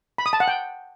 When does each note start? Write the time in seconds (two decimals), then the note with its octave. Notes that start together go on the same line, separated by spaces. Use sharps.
0.18 B5
0.26 D#6
0.33 A5
0.40 F#5
0.48 G5